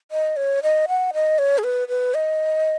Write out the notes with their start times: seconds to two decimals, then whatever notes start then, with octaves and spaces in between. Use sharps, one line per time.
0.11 D#5
0.36 C#5
0.63 D#5
0.88 F#5
1.14 D#5
1.38 C#5
1.58 G#4
1.64 B4
1.88 B4
2.14 D#5